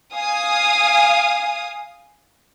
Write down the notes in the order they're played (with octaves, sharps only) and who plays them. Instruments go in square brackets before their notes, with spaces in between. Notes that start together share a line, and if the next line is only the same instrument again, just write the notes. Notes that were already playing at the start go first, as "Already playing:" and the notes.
[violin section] F5 G#5 D#6